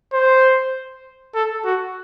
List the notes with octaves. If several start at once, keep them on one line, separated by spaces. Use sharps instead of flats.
C5
A4
F#4